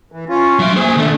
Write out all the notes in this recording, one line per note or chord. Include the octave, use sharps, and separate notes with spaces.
E3
C#4 F4
F#3 E5
A#3 G#4 C5
D#3 A3 D4